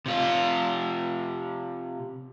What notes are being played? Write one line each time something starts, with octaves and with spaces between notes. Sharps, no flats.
C3 F4